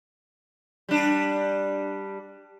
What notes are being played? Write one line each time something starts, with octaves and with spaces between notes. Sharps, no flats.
G3 D4